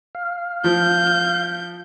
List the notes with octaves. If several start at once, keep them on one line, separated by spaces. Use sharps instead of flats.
F5
F3 G6